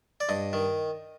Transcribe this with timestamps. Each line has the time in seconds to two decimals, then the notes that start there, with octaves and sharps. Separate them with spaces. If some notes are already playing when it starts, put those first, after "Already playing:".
0.20 D5
0.29 G2 D#5
0.53 D#3